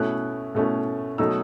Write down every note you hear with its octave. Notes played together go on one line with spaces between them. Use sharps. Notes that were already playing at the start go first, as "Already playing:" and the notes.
Already playing: B2 A3 C#4 E4 F#6
B2 A3 C#4 E4
B2 F#3 A3 D#4 E6